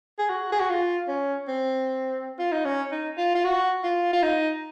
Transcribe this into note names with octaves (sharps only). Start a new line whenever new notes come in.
G#4
F#4
G#4
F#4
F4
C#4
C4
F4
D#4
C#4
D#4
F4
F4
F#4
F4
F4
D#4